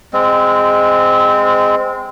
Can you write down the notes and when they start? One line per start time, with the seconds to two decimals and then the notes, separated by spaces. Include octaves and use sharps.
0.13 G#3 C4